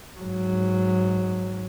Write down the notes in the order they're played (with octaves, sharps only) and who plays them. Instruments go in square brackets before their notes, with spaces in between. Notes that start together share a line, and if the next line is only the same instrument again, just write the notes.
[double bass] G#2 F#3